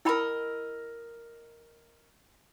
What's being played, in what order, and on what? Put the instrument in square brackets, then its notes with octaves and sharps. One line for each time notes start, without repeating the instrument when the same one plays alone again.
[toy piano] E4 G5 B5 [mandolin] A#4 D#5 E6